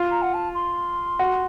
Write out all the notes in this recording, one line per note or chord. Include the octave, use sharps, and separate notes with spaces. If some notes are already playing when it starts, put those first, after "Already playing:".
Already playing: F4
A#5
F#5
A5
C6
F#4